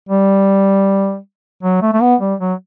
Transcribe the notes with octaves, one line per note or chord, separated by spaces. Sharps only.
G3
F#3
A3
A3
B3
G3
F#3